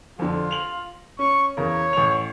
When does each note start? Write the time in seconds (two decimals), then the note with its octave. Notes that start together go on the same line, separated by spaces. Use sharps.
0.19 F2 D3 F4
0.51 F7 F#7
1.19 C#4 C#6
1.57 E2 C#3 A#4 C#5
1.93 A1 C#6 F7